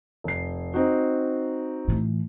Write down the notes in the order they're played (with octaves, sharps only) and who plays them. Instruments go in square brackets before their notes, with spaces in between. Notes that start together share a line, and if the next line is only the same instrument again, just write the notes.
[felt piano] F1 C7
C4 D#4 F#4
[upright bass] A2 E3